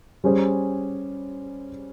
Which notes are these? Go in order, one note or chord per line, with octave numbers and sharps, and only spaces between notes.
G3 C#4 G#4 C5